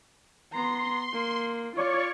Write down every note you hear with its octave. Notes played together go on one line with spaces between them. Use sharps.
B3 A#5 C6
A#3
F4 C#5 D5 C#6